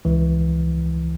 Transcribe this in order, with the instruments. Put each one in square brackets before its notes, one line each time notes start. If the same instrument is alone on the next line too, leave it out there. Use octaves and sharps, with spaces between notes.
[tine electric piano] C#2 E3